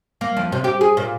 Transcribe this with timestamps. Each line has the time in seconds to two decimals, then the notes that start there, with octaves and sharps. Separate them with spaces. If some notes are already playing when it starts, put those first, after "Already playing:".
0.21 A#3
0.37 F2
0.52 C3
0.64 G4
0.81 G#4
0.97 A#2